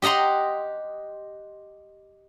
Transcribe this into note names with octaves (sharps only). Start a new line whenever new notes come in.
G4 D#5 F#5 A#5 C6